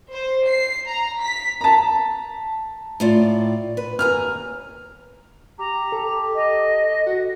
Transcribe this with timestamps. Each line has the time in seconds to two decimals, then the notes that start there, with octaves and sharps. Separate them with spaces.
0.12 C5
0.46 C7
0.87 A#5
1.20 B6
1.61 A5 A#5
3.00 A2 F4 D5
3.77 B4
3.99 D#2 G#5 A#5 F6
5.59 G4 A#5
5.92 A4
6.35 D#5
7.06 F#4